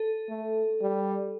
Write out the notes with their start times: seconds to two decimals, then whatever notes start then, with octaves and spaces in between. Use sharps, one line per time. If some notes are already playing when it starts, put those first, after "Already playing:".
Already playing: A4
0.30 A3
0.82 G3